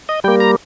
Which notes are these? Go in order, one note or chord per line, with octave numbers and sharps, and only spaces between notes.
D#5
G3 A#3 G5
A#5